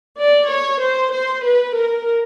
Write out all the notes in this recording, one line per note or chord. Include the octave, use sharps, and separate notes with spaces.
D5
C#5
C5
C5
B4
A#4